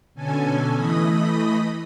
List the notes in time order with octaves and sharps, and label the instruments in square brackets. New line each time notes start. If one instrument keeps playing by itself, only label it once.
[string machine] B2 D3 C#4 A4 G#5
E3 A3 D#5 B5 D#6